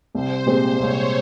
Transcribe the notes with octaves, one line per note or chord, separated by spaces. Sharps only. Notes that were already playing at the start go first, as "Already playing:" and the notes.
C2 C5
A#2 G#3 C4 G4
C2 C#5